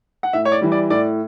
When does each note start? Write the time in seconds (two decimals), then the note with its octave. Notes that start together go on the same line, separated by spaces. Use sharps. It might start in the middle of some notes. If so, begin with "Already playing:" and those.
0.23 F#5
0.33 A2 E5
0.45 C#5
0.52 D5
0.61 E3 G3
0.72 D5
0.90 A2 D5